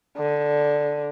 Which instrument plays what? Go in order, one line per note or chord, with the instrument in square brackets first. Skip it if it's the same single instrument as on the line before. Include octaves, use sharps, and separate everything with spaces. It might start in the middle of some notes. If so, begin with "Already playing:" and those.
[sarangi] D3